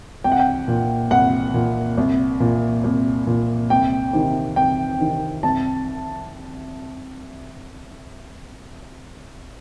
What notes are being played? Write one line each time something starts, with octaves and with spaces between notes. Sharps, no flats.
C2 G5
F#5
G5
A#2
C2 F#5
A#2
C2
A#2
C2
A#2
C2 G5
C3 D#3
C2 G5
C3 D#3
C2 A5